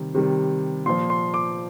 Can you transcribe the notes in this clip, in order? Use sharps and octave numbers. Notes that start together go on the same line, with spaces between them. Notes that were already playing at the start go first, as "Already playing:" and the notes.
Already playing: C3 D#3 G3
C3 D#3 G3
A#2 F3 C6
C6
D6